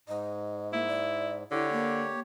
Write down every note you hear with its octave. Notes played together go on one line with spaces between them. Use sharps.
G#2 D#5
A#3 E4
D5
D3 E4 G4 C#5
A#3